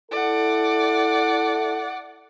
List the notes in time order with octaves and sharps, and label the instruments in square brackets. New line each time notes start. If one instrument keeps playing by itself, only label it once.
[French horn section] E4 A4 [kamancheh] D5 F#5